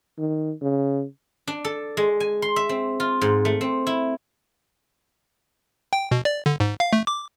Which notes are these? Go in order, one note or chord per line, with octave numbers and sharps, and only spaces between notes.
D#3
C#3
D4
A4
G#3
G#5
C6
E5
C4
F4
G#2
A3
C4
E4
G5
B2
D5
D3
G#2
F5
A3
D6